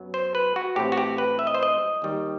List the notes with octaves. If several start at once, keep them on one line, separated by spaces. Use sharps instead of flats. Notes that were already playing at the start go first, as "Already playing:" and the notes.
Already playing: F#2 F#3 B3
C5
B4
F#4
A2 E3 A3 C4 G4
F#4
G4
B4
E5
D#5
C5
D#5
D#2 D#3 G3